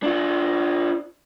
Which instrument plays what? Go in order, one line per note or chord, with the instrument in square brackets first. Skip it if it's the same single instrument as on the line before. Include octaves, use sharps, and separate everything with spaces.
[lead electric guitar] D4 F4